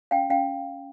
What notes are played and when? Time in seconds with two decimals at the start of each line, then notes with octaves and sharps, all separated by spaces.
0.11 C#4 F5 G5
0.30 C#4 F5 G5